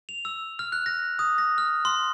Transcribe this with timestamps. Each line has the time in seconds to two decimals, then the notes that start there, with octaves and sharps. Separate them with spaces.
0.09 F7
0.25 E6
0.59 F6
0.72 F#6
0.86 A#6
1.19 D#6
1.38 A#6
1.58 F6
1.85 C6